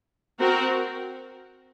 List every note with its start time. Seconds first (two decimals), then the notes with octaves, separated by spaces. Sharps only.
0.39 C4 F#4 A#4